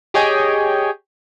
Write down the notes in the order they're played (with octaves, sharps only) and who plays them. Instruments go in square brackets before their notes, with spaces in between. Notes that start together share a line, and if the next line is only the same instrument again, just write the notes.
[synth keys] G4 G#4 C#5 D#5 G5 G#5